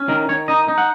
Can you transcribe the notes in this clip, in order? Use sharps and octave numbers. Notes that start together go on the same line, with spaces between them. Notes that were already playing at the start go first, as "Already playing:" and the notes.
Already playing: C#4
D#3 A#4
D#3 C#5
D#4 D#5
D#4
F#5